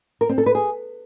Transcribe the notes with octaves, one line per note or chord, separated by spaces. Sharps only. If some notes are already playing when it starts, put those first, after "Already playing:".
A#4
C4
A4
B4
G#4